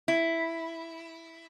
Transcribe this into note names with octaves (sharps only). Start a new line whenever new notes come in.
E4